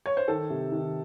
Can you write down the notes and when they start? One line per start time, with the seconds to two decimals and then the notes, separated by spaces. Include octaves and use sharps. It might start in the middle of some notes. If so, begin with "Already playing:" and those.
0.06 C#5
0.17 C5
0.28 D#3 A4
0.50 C3
0.72 D#3